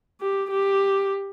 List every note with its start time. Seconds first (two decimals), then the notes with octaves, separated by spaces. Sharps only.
0.21 G4
0.51 G4